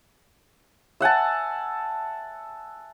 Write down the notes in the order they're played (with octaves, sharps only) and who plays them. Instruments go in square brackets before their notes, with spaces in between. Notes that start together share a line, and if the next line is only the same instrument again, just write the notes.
[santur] E5 F#5 G#5 A5